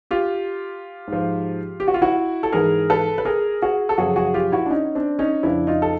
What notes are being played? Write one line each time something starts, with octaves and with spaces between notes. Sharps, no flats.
F4 G4
G#2 F3
G4
F#4
F4
E4 F#4
A4
G#2 E3 G#4 A#4
A4 B4
B4
G#4 A#4
F#4 G#4
A4
F#2 C#3 F3 F#4 G#4
F#4 G#4
F4 G4
E4 F#4
D4
C#4 D#4
C4 D4
C#4 D#4
F2 C#3 F3 D4 E4
D#4 F4
A4